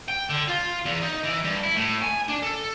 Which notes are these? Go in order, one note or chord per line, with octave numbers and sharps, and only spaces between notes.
G5
D3
F4
E2
D#4
E3
G2
E4
A2
G#5
D4
A4